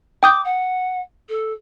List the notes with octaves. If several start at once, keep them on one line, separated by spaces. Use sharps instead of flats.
G5 D6 D#6 G6
F#5
A4